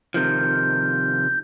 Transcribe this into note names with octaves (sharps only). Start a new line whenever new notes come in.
C3 D#3 F3 G6